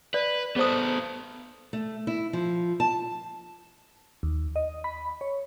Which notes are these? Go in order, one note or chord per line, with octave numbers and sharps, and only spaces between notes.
B4 D5
B3 G#4 A4 C5 D#6
A3
E4
F3
A5
D#2
D#5
B5
C#5